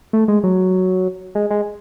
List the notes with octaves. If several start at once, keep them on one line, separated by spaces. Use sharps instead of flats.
A3
G#3
F#3
G#3
G#3